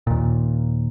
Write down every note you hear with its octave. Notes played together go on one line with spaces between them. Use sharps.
D#2 A#2